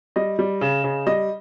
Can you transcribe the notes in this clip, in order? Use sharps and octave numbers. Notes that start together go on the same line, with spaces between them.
G3 D#5
G3
C#3
C#3
G3 D#5